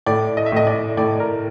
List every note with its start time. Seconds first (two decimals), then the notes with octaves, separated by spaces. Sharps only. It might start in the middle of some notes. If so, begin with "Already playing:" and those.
0.06 A2 D5
0.37 D#5
0.46 E5
0.52 A2 D#5
0.67 D5
0.97 A2 D5
1.20 A#4